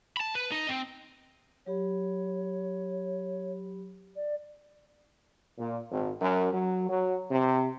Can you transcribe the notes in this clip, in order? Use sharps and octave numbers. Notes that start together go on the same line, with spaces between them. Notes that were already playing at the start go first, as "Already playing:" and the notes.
A5 B5
B4
D#4 D#5
C4
F#3 G4 C#5 B5
D5
A#2
G#1
F#2
F#3
F#3
C3